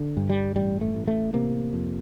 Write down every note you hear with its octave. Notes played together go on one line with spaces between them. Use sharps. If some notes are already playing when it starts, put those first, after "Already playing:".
Already playing: D3
G2
G3
A1 G3
A3
A1
A3
C3 A#3
F2